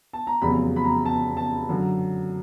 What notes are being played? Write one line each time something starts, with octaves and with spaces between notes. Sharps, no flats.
A5
A#5
F1 E2 C#3 F#3 B5
B5
A#5
A5
A5
F#2 D3 F#3